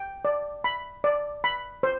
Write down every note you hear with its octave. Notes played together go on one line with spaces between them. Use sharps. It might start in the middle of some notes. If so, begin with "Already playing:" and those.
Already playing: G5
D5
B5
D5
B5
C5